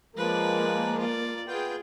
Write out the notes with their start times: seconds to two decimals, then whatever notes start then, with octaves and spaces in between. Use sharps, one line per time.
0.17 F3 G#3 A#3 B4 D5
0.98 F4 D5
1.47 B3 F4 G#4 G5